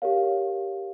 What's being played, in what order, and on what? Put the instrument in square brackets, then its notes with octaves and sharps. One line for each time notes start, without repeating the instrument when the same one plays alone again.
[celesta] G4 A#4 C#5 F5